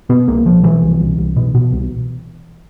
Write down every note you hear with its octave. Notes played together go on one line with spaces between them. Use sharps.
B2 B3
C2 A#3
C2 F3
B2 E3
C2
C2
C2
B2
B2
C2